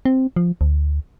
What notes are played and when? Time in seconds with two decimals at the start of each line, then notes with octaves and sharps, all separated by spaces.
0.05 C4
0.36 F3
0.61 D2